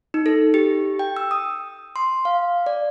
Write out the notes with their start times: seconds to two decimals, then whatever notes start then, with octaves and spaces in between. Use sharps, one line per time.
0.14 D#4
0.26 A4
0.54 G4
0.99 G5
1.17 E6
1.31 D#6
1.96 C6
2.25 F5
2.66 D5